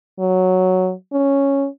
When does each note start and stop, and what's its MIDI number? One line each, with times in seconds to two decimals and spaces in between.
0.19 0.93 54
1.13 1.67 61